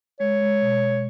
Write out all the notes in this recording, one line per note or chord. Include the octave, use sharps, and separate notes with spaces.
G#3 C#5
G#3
B2
G#3